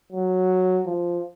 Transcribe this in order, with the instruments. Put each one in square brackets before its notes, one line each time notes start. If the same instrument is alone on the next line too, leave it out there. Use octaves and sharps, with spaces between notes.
[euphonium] F#3
F3